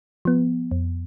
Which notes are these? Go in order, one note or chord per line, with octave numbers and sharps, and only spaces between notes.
F3 B3
F2